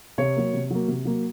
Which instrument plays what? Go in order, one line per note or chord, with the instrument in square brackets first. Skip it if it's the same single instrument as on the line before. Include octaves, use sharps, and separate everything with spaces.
[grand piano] C3 C#5
F#3 A#3
C3
F#3 A#3
C3
F#3 A#3